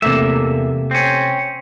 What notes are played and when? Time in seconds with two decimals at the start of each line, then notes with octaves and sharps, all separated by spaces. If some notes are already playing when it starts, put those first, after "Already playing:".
0.02 E2 C3 A3 A#3 E5
0.91 C4 C#4